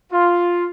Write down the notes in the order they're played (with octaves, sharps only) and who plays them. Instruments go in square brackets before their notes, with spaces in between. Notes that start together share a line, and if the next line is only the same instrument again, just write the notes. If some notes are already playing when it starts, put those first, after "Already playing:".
[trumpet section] F4